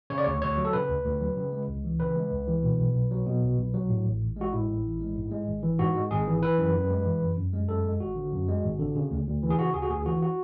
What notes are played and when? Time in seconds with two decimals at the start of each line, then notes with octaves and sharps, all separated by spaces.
0.10 C#3 C#5
0.18 D5
0.24 D2 C#5
0.42 D2 C#5
0.58 F#3
0.65 A4
0.73 C#3 B4
0.89 D2
1.05 D2
1.20 F#3
1.37 C#3
1.52 G#3
1.68 C#2
1.84 E3
2.00 C#3 B4
2.16 G#3
2.31 C#2
2.47 E3
2.63 B2
2.79 B1
2.94 B1
3.11 F#3
3.26 B2
3.42 B1
3.57 B1
3.74 F#3
3.89 A2
4.06 A1
4.21 A1
4.36 G#3 F#4
4.53 A2 E4
4.68 A1
4.85 A1
5.00 G#3
5.16 G#2
5.31 G#3
5.47 G#1
5.63 E3
5.79 G#2 F#4
5.95 G#3
6.11 G#1 G#4
6.27 E3
6.42 E3 B4
6.58 F#2
6.74 F#2
6.90 G#3
7.05 E3
7.22 F#2
7.37 F#2
7.53 G#3
7.69 F#2 A4
7.84 G#3
8.00 G#1 F#4
8.16 D3
8.32 F#2
8.48 G#3
8.64 G#1
8.79 D3
8.95 C#3
9.11 D2
9.27 D2
9.43 E3
9.50 G#4
9.58 C#3 F#4
9.74 D2 G#4
9.82 F#4
9.90 D2 G#4
10.06 E3 F#4
10.22 F#4